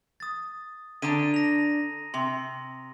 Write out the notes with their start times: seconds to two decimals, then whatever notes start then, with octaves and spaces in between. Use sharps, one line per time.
0.20 D#6 A6
1.02 D3 D4 A5 A#5 D#6 D#7
1.34 A#6 F7
2.14 C3 C6